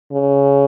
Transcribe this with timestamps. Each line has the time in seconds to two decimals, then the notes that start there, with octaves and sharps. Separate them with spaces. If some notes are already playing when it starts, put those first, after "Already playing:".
0.12 C#3